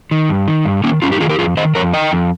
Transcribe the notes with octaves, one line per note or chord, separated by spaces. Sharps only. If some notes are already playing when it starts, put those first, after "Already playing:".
D#3
G2
D#3
G2
D#3 A#3 C#4
G2 C#4 F4
D#4 G4
D#3 F4 G#4
G4 A#4
F2 F4 G#4
D#3 C5 D#5
F2 A#4 C#5
D#3 D#5 G5
F2